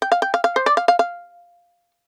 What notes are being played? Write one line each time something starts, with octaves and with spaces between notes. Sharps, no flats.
G5
F5
G5
F5
F5
C5
D5
F5
F5
F5